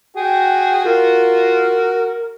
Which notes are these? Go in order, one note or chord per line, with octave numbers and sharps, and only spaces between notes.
F#4 G#4 G5
F4 A#4